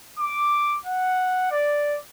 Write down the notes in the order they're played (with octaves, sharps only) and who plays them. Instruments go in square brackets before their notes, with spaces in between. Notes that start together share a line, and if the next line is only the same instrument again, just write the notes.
[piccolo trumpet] D6
F#5
D5